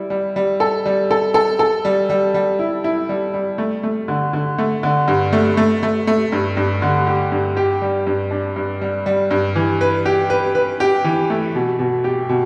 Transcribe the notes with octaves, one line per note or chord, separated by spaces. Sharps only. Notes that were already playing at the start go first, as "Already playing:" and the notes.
Already playing: G3 E4
G3
G3
A4
G3
A4
A4
A4
G3
G3
G3
E4
E4
G3
G3
A3
A3
D3
D3
A3
D3
G2
A3
A3
A3
A3
G2
G2
D3
G4
G2
G4
G3
G2
D4
G2
G3
G3
G2
E3
B4
G4
B4
B4
G4
E3
A3
B2
B2
G4
B2